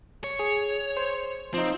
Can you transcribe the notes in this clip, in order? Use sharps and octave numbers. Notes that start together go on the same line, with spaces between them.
C#5
G#4
C5
F3 C4 D#4